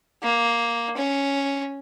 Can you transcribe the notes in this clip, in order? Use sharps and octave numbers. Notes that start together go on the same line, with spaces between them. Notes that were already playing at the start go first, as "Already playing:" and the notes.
A#3
C#4